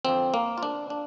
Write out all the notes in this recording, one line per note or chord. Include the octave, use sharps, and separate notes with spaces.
F2 D3 F3 C4
A#3
F4
D4
D4